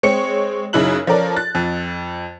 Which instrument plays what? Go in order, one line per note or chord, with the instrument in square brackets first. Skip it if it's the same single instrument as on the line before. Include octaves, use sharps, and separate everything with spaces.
[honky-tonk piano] G#3 C4 C#5 C#7
F#2 C#3 D#4 E4 F#6 F#7
F3 C#4 A4 A#4 D5
F#6 A6
F2